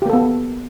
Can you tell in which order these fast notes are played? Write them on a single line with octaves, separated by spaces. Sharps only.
G4 A#3 A4 B3